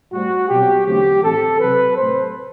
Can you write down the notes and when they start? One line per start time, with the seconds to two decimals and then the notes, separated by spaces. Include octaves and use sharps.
0.12 A2 G3 C4 F#4
0.49 B2 F#3 C4 G4
0.85 E2 D3 F#3 A3 C4 G4
1.22 A2 E3 A3 C4 A4
1.59 C3 F#3 C4 B4
1.96 A2 F#3 A3 C4 C5